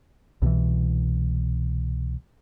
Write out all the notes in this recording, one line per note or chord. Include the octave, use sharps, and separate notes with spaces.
C2 B2 D#3 E3